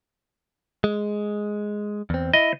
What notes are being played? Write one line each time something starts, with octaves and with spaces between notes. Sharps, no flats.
G#3
E2 C4
E4 D#5